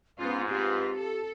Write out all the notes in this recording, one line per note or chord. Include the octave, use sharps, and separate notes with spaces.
G#2 B3 C#4 F4
C4 F4 G4 B4
A4